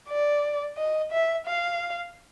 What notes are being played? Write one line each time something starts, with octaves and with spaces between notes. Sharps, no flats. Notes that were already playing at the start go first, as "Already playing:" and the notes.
D5
D#5
E5
F5